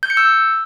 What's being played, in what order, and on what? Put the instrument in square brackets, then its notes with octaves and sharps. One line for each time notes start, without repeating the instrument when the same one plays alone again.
[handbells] G6
C#7
E6